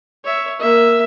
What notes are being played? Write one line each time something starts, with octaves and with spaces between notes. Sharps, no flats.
C#5 E5
A#3 E5